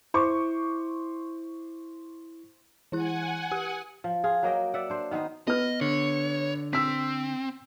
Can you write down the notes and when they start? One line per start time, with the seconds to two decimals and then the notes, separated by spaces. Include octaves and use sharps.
0.14 E4 C5 C#6 D6
2.92 E3 E4 F#5 G#5 F#6
3.52 G4
4.04 F3
4.24 F4 G#4
4.43 F#3 A#3 D#5 G5
4.74 D5 E5 F#5
4.90 D4 C5
5.11 D#3 B3 D#4 C5
5.48 B3 D#5 F6
5.81 D3 C#5
6.73 C4 E6 B6